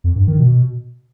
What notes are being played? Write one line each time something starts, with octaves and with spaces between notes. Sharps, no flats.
F2
G2
D#3
B2